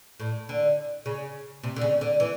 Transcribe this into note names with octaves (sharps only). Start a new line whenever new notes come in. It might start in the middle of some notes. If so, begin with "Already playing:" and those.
A2
D3
C#3
C3
D3
C#3
D3
E3